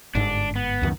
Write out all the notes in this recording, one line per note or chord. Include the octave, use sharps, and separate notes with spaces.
G1 G#2 D4
B3
C#2 F#2 D#3